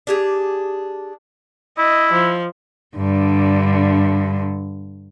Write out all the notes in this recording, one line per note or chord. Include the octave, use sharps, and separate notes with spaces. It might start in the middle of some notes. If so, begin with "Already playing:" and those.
D4 G4 G#4
E4 D#5
F3
G2 D3